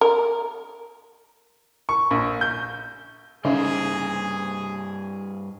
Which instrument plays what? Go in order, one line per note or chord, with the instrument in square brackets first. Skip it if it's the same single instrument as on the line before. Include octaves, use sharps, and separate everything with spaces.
[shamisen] A#4
[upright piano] C#6
A#1
G6
[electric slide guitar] G2 C5 [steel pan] C#3 D#4 [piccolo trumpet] G#4